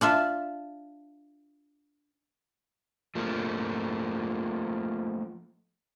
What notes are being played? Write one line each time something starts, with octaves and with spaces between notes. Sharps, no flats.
D4 F4 E5
F3 A3 A#3